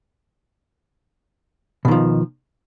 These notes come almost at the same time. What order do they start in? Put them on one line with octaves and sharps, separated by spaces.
B2 D#3 F3